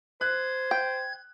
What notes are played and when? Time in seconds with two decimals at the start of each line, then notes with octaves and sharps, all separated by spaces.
0.21 C5 F#6 G#6
0.71 G5